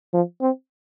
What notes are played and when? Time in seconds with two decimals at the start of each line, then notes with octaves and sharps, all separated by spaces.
0.13 F3
0.41 C4